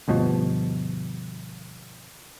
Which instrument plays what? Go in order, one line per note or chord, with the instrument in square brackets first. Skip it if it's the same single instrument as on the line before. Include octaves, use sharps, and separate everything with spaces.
[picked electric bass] D2 G2 B2 F3